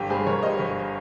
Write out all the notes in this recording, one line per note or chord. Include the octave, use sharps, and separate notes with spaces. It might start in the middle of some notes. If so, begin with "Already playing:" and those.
Already playing: G1 G4
G2 G#4 C5
G1 A#4 C#5
G3 C5 D#5
G1